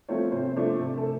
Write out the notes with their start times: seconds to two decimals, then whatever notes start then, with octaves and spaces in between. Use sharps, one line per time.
0.09 F3 A3 C4 F4 C#5
0.32 C3 C5
0.56 F3 A3 D4
0.80 C3
0.98 A4